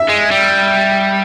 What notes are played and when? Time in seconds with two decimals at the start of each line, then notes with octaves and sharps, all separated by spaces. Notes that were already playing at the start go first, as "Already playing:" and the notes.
Already playing: E5
0.09 G#3
0.31 G3